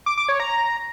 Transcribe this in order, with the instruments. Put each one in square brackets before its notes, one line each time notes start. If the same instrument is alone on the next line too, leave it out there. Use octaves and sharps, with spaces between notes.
[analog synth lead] D6
D6
C#5
A#5